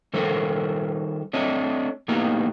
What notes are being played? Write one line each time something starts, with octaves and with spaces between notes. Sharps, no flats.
D#3 G3 A4 A#4 C5
A3 C4 D4 C#5 D#5
A2 A#3 B3 D#4 G4 A#5